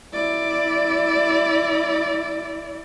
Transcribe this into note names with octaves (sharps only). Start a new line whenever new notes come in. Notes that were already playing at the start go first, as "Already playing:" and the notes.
E4 D5